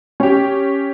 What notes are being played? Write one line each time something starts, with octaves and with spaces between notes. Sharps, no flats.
C#4 G4